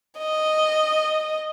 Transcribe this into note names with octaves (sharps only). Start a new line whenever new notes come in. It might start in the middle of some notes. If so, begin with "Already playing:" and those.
D#5